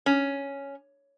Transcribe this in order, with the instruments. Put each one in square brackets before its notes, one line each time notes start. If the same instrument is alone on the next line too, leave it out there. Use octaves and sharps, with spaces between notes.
[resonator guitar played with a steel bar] C#4